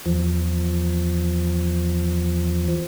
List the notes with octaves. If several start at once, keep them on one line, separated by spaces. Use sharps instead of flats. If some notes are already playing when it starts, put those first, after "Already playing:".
E2 F3